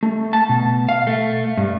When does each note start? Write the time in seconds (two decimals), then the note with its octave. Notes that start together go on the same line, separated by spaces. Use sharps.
0.03 A3
0.33 A5
0.49 B2
0.89 F5
1.07 A3
1.57 G2